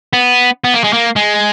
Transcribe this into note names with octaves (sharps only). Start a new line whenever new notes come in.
B3
B3
A#3
G#3
A#3
G#3